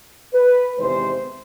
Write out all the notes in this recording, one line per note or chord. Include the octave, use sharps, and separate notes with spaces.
B4
E2 C3 D#3 G#3 C5